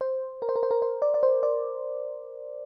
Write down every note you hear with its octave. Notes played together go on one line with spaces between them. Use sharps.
C5
A#4
C5
A#4
C5
A#4
C5
D5
D5
C5
D5